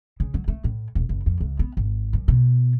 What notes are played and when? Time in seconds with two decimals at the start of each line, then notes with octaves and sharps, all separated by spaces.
0.20 C#3
0.34 F#3
0.48 A3
0.64 A2
0.95 D#1
1.09 F#1
1.26 F2
1.40 C#2
1.59 B3
1.77 G#1
2.13 F#2
2.28 B2